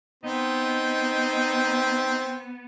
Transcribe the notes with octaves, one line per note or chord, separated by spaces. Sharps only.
B3 C4 D#4